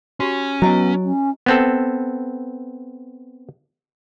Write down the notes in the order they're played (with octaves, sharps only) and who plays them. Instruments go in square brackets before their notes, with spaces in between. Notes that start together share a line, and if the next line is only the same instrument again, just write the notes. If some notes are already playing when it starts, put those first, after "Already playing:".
[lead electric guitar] C#4 [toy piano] F#4 G4
[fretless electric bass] F#3 [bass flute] B3 [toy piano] E4 D#5 G#5
[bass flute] C#4
[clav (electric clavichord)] B3 C4 A4